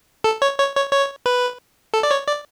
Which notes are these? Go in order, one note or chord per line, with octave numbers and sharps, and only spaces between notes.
A4
C#5
C#5
C#5
C#5
B4
A4
D5
C#5
D5